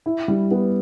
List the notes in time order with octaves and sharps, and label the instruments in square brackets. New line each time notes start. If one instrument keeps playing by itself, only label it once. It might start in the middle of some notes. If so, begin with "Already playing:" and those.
[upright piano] E4
G3
B3